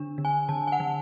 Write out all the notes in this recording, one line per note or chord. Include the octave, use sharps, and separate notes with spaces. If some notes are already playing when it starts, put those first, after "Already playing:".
Already playing: D3 D4
D3
G#5
D3 A5
G#5
F#5
D3